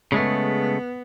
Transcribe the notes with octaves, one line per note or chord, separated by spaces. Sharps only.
C#3 G#3 A3 B3